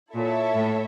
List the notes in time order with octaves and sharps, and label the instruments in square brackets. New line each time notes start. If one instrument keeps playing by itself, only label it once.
[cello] A#2 [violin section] E4 A4 C#5 E5
[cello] A2